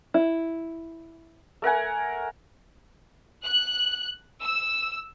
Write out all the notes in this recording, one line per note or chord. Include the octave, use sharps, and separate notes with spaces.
E4
A3 A#4 F#5 G#5
F#6
E6